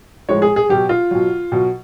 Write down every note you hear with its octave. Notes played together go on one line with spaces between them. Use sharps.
A2 F3 G#3 C#5
G#4
G#4
B2 F#3 G4
F4
B2 F#3
B2 F#3